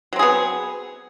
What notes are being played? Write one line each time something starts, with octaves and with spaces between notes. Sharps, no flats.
F#3 B3 C4 G#4